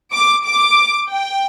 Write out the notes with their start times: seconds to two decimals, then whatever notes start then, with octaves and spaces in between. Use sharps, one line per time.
0.13 D6
0.46 D6
1.09 G5